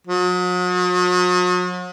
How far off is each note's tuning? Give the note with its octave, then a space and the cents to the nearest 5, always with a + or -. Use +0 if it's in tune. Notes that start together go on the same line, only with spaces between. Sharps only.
F#3 -45